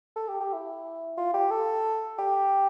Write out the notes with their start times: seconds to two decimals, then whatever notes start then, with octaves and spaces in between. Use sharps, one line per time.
0.16 A4
0.28 G4
0.40 G4
0.53 E4
1.17 F4
1.34 G4
1.51 A4
2.18 G4